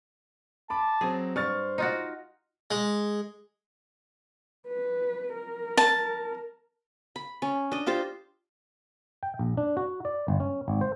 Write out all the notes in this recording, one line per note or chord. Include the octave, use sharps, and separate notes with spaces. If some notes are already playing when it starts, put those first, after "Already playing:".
A5 B5 D6
F#3 C4 G#4
G2 C5 C#6 F6 A6
D#4 F4 F#4
G#3
B4
A#4
A5
B5
C#4
D4 D#5
F4 G4 C5 A5
G5
A#1
D4
F#4
D5
G1
C#4
G#1
C5